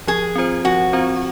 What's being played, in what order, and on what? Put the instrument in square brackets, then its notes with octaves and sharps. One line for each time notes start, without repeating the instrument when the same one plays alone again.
[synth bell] F3 [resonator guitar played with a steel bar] G#4
[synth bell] C4 F4 C5
[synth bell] F3 [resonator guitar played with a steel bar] F#4
[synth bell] C4 F4 C5